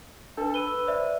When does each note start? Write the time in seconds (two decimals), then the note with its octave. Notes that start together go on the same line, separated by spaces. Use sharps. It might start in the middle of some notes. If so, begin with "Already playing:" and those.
0.37 D4 A4 B4
0.54 B4 E6 D#7 G7
0.87 C5 D5 E5